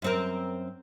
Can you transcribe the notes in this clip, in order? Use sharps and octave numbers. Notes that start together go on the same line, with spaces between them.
F#2 C4 A#4